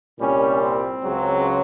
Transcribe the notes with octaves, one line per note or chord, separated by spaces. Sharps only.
C2 A#2 G3 C#4
C4
C#2 C#3 F#3